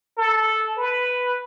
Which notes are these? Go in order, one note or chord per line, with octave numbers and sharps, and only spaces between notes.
A4
B4